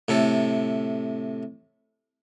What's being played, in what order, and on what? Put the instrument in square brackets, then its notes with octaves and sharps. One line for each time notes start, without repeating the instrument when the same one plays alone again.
[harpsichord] A2 C3 A4